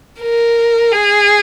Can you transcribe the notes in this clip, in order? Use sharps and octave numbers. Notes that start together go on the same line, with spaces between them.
A#4
G#4